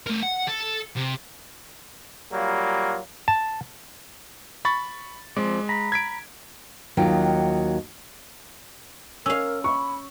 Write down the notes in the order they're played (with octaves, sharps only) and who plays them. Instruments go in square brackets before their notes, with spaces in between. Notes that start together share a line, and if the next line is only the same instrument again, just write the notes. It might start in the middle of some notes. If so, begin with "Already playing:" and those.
[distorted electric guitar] A3 A#4
F#5
A4
C3
[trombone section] F#3 G3 A#3 F4
[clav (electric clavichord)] A5
[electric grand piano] B5 C#6 A6
[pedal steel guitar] F3 C4 D5 [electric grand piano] G#3
[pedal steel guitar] A#5 B5
[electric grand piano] G#6 B6 D7
[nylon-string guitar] D#2 D#3 F#3 F4 G5
[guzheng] C#4 F5 [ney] A#4 [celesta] E6
[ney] B5 [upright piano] C#6